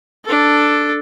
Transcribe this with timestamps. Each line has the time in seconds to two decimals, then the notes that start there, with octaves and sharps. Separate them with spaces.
0.25 D4 A4